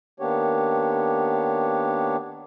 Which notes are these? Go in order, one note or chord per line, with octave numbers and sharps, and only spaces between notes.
D#3 A#3 B3 D4 G4 C#5